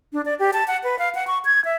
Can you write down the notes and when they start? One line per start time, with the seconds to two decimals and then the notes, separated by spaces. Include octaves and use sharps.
0.13 D4
0.25 D5
0.39 G4
0.53 A5
0.68 F#5
0.84 B4
0.99 F5
1.15 F#5
1.27 C#6
1.45 G#6
1.65 E5